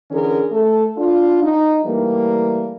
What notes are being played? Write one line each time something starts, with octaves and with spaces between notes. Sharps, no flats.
D3 E3 C#4 G#4 A#4
A3 A4
D4 F4
D#4
E3 G3 A3 A#3